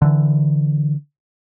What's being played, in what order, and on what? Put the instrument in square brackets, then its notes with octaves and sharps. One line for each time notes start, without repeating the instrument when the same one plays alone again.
[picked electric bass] D3 E3